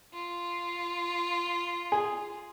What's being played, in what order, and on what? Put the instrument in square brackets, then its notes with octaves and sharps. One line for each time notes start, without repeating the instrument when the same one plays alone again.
[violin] F4
[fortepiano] G#4